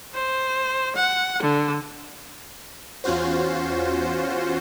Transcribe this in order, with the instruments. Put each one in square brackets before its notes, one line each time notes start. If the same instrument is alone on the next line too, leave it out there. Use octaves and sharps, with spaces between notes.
[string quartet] C5
F#5
D3
[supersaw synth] E2 C#4 F4 F#4 C5